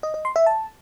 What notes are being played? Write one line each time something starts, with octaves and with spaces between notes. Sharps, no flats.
D#5
D#5
C6
E5
A5